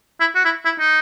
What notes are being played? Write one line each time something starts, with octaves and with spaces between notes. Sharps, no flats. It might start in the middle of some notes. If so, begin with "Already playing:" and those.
E4
F#4
E4
E4
D#4